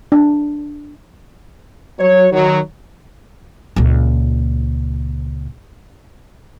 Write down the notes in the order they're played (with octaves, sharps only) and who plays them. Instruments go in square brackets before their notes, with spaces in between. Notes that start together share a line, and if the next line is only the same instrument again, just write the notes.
[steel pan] D4
[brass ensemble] F#3 C#5
D#3 F#3
[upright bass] C#2 A#2